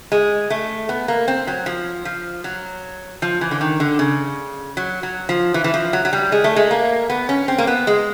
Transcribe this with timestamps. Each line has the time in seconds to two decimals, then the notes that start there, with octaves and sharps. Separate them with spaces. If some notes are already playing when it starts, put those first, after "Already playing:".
0.12 G#3
0.50 A3
0.89 B3
1.08 A#3
1.28 C4
1.47 F#3
1.66 F3
2.05 F3
2.44 F#3
3.22 F3
3.41 E3
3.51 D3
3.61 D#3
3.80 D3
3.99 C#3
4.77 F#3
5.03 F#3
5.29 F3
5.54 E3
5.64 E3
5.74 F3
5.93 F#3
6.05 F#3
6.13 G3
6.32 G#3
6.44 A3
6.56 G#3
6.71 A#3
7.10 B3
7.29 C#4
7.48 C4
7.58 A#3
7.67 B3
7.87 G#3